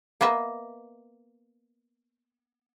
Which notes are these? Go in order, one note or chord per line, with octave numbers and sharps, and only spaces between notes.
A#3 B3 D#5 E5